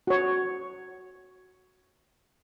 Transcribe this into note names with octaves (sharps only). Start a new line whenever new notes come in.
F#4 C#5